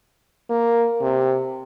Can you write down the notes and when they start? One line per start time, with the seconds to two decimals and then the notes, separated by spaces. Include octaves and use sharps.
0.50 A#3
1.01 C3